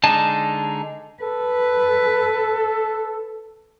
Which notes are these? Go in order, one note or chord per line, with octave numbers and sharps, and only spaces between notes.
D3 G#3 D#4 A5
A4 B4